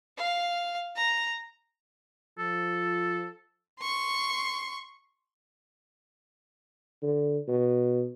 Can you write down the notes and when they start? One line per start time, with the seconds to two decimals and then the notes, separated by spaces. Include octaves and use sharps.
0.17 F5
0.96 A#5
2.39 F3 A4
3.80 C6 C#6
7.02 D3
7.48 B2